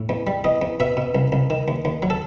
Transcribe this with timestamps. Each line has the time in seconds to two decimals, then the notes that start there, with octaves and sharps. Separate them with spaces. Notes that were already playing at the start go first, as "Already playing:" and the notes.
Already playing: A2
0.09 E2
0.27 G3
0.44 E2 D#5
0.62 E2
0.80 B2 E5
0.97 B2
1.15 C2
1.32 C2
1.50 D#3
1.68 D#2
1.85 D#2
2.02 F#3
2.10 A4